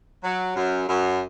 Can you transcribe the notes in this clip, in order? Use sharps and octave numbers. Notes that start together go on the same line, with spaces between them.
F#3
F#2
F#2